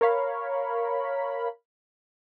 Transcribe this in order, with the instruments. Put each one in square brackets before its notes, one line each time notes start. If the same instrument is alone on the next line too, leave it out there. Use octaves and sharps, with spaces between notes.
[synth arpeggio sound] A#4 C#5 F5 B5